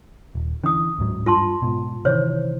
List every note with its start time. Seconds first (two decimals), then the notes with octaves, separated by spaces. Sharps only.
0.35 D#1
0.64 D3 E3 C#4 D#6
0.98 D1 G#2 F#3
1.26 G2 F4 A5 C6
1.62 G#2 B2
2.05 C3 D#3 E3 C5 C#5